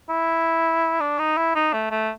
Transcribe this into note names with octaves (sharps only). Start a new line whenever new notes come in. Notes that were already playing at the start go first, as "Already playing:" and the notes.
E4
D4
D#4
E4
D#4
A3
A3